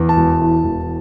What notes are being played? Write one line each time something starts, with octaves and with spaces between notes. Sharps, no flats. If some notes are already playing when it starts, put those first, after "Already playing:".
Already playing: E2
A5
E1
E3
E1